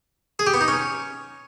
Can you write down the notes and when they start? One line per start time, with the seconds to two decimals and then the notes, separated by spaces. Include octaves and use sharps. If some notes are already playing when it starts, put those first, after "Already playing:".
0.39 G#4
0.47 G4
0.54 B3
0.61 D#4
0.68 C#4